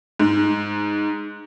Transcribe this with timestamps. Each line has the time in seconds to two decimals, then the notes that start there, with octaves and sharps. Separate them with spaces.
0.20 G#2